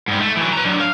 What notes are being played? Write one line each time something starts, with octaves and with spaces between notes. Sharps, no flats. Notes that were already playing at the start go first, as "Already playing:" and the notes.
G#2 G3
A3
E3 F#3
B4 A#5
F#3 D4
F5